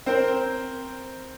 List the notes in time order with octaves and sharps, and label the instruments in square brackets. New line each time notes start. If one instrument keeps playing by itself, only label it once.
[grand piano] C4 A#4 C5